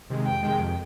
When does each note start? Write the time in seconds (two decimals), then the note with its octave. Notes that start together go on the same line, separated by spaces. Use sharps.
0.10 C3 D#3 G#3
0.26 F2 G5
0.43 C3 D#3 G#3
0.60 F2